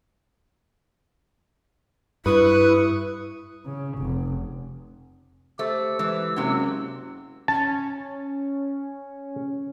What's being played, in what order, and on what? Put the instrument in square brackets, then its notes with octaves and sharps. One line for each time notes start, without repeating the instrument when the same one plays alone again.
[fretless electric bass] G2 [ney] E4 [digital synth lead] B4 [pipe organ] C#6 D#6
[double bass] C#3
F1
[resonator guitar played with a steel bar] A3 [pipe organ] G4 E6 [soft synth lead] C5
[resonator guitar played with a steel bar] E3 [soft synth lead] G#3
[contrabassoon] F#1 [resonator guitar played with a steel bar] C3 F#3
[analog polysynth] C#4 [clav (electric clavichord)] A5